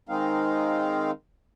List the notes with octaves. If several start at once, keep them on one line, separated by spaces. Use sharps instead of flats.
D#3 G#3 C4 D#4 F5